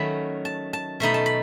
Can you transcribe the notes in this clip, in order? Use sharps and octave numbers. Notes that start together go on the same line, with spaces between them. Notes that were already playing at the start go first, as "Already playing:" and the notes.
Already playing: D#3 F#3 A3 C#4 B5
A5
A5
B2 A3 D#4 B5
A5
B5